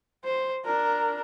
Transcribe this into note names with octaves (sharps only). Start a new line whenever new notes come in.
C5
D4 A#4